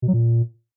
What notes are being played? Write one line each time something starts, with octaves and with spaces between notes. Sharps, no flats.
B2
F#3
A#2